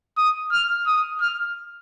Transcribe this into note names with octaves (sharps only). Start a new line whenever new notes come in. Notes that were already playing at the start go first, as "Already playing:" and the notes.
D#6
F6
D#6
F6